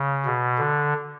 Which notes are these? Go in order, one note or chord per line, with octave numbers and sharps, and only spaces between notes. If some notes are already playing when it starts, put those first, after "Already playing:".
Already playing: C#3
B2
D3